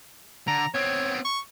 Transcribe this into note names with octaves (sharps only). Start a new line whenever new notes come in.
D3 A#5
B3 C4 C#5
C#6